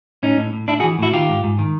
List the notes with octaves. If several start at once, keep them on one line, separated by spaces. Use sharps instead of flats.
A2 C#4 D#4
A2
A2
A2 D4 E4
F#4 G#4
E3
A2 E4 F#4
D#3 F4 G4
G#2
G#2
D#3